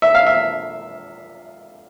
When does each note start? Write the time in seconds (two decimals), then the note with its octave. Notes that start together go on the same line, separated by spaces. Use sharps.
0.02 E5
0.15 F5
0.27 E5